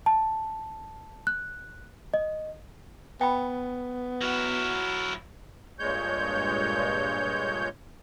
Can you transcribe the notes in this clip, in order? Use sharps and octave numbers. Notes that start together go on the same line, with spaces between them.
A5
F#6
D#5
B3 G5 B5
F#3 E4 F#4 F6
G2 A#2 G#3 C#5 G6